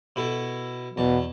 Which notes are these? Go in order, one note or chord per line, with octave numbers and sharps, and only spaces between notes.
B2 E4 A4
E2 B2 A5